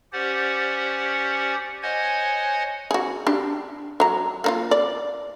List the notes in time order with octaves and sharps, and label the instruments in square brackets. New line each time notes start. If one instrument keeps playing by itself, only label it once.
[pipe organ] C#4 G4 C5 D5 F#5
C5 C#5 D#5 F#5 G#5 G#6
[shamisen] F#4 G#4
D4 G4
F#3 A#5
A#3 D#4 F4
D5